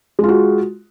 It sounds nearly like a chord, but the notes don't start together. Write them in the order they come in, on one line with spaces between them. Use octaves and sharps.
G#3 F4 F#4